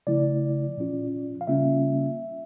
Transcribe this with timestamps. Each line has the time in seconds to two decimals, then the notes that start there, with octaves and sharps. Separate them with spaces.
0.07 C#3 F3 A3 E4 D5
0.77 A#2 F3 C#4 F4
1.41 F5
1.47 C#3 G3 A#3 C#4 F4 E5